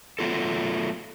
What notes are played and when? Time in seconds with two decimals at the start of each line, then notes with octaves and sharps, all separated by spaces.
0.19 F#3 A3 B3 F4 A4